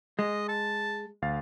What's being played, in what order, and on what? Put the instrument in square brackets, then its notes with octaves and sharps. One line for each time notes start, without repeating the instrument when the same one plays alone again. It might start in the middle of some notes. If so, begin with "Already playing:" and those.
[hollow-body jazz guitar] G#3 [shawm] D#5
[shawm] A5
[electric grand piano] D2 F5 A6